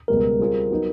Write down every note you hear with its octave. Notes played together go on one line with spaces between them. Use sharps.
C#2 B2 G3 B3 A#4
G3 C4 F4 G#4
F#3 B3 D#4